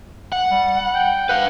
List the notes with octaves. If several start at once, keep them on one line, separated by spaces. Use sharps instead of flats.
F#5
G3
G5
B4 F5 F#5